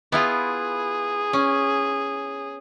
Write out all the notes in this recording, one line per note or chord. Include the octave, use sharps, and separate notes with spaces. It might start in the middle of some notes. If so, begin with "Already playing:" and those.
B3 E4 F4 G#4
C#4